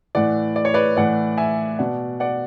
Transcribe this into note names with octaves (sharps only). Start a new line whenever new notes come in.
A2 E3 D5 F#5
D5
C#5
B4 D5
A2 E3 D5 F#5
E5 G#5
B2 D5 F#5
D5 F#5